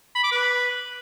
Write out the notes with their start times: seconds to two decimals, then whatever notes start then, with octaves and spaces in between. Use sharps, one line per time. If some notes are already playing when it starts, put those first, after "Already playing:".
0.15 B5
0.24 D6
0.32 B4